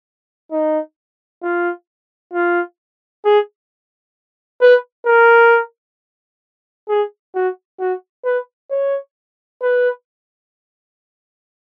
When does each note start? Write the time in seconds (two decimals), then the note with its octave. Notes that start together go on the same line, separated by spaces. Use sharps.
0.52 D#4
1.43 F4
2.34 F4
3.25 G#4
4.62 B4
5.07 A#4
6.89 G#4
7.35 F#4
7.80 F#4
8.25 B4
8.71 C#5
9.62 B4